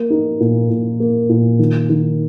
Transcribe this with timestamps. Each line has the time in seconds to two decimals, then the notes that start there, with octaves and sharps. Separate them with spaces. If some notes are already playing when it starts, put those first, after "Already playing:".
Already playing: A#3
0.10 D#4
0.40 A#2
0.70 A#2
1.00 A#3
1.29 A#2
1.59 D#3
1.89 D#3